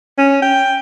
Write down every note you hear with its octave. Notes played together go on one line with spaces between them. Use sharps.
C#4
G5